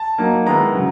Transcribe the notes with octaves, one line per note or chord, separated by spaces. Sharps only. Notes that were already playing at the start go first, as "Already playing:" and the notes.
Already playing: A5
F#3 A#3 D#4
D#3 G#3 B3 E4 A#5
C#3 F#3